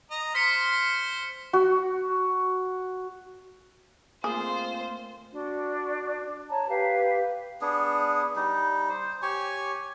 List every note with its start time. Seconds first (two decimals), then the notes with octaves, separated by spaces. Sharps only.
0.11 D#5 A#5
0.35 C5 C6 F6 B6 C#7
1.53 F#4
4.24 A3 A#3 C4 F4 G#4 C5
5.33 D4 F#4
6.50 C#5 A5 A#5
6.69 G4 B4 F5
7.61 B3 D4 G#4
8.36 G3 D#4
8.89 C5
9.22 G4 C#5 G#5 C#6